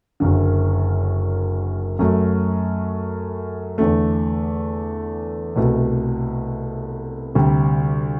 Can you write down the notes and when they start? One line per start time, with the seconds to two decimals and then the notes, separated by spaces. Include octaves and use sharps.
0.20 F#1 F#2 D3
1.99 F#2 F#3 A3
3.78 E2 D3 A3
5.56 C2 B2 A3
7.35 D2 C3 G3